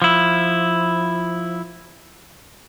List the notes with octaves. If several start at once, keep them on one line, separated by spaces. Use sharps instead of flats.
F3 E4